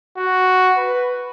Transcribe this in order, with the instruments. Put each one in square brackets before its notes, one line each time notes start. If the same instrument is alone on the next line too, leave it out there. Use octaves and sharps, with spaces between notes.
[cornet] F#4
B4